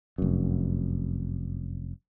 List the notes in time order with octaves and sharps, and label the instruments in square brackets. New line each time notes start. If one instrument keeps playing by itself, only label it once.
[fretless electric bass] F1 F#2